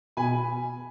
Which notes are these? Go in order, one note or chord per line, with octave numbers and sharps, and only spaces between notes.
B2 G#5 B5